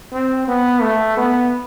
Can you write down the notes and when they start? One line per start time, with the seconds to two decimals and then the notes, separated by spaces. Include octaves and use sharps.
0.12 C4
0.48 B3
0.82 A3
1.17 B3